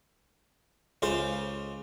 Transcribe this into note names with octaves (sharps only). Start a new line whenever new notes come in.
C#2 C#3 F4 C5 F5